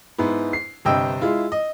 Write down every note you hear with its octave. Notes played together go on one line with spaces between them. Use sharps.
G#2 G#3 B3 E4
C7
G1 G2 C3 D#5 G5 E6
G#3 E4 F4
D#5